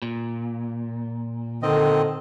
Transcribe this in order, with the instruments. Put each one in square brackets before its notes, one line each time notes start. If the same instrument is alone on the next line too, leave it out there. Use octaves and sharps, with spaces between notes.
[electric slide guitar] A#2
[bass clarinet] D3 [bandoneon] D#3 C4 D#5